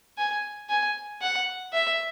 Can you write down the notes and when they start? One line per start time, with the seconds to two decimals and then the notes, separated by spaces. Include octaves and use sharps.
0.18 G#5
0.69 G#5
1.22 F#5
1.73 E5